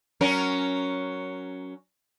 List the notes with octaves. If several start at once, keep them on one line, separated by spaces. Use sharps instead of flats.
F#3 C#4 A#4